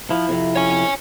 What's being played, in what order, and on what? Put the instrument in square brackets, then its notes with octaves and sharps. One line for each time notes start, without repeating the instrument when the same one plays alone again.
[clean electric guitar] F3 [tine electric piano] E4
[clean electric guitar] F2 C3
[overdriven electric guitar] C#5 G#5